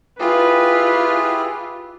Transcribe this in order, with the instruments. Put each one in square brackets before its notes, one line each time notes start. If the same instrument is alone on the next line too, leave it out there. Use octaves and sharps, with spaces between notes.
[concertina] E4 G4 G#4 [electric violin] F4 [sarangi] B4